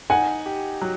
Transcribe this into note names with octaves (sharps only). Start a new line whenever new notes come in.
D#4 F#5 G#5
G4
F#3